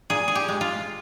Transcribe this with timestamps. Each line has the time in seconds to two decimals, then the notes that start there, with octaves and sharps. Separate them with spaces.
0.10 A#2 G#4
0.28 G#4
0.35 G4
0.48 G#3
0.61 F4